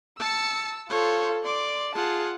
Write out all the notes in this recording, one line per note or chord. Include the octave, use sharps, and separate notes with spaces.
A5 E6 C#7
F4 A4 C5 C#5
D5 C6 D6
F4 G#4 F#5 A5